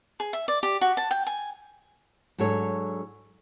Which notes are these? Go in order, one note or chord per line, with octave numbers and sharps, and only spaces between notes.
G#4
E5
D5
G4
F#4
A5
G5
G#5
G#2 F#3 D4 A4 C#5